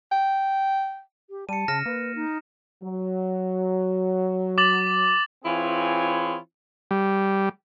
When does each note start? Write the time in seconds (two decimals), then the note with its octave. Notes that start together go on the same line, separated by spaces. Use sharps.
0.12 G5
1.30 G4
1.49 G3 A5 C#7 D#7
1.68 C#3 F6 A#6 E7
1.86 A#3 B4
2.15 D#4
2.83 F#3
4.58 D6 A6 F#7
5.45 E3 C4 E4 F4 G#4 C#5
6.91 G3